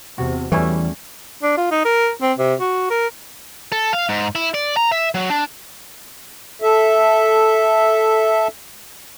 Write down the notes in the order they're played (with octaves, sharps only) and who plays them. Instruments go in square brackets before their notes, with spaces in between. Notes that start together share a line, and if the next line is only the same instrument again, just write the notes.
[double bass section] E2 C3 [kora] F#4
[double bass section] E2 G3 [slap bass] E3 [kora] A3 C#4 E4
[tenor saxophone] D4
F4
D#4
A#4
C4
C3
F#4
A#4
[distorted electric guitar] A4
F5
G#2
E4
D5
A#5
E5
F#3
D4
[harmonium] A4 E5